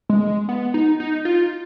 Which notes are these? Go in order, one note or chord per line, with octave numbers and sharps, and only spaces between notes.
G#3
B3
D#4
D#4
F4